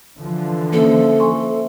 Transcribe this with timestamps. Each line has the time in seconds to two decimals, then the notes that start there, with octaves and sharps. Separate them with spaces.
0.17 D3 E3 F3
0.73 A#3 C#4 A4 C5 E5
1.20 G#5 C6 C#6